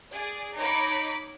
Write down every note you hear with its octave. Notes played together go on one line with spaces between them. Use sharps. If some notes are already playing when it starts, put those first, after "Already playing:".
G#4 D5
D#4 C#5 B5 D6